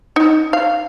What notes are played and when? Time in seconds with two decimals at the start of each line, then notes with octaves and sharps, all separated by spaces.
0.16 D#4
0.53 F5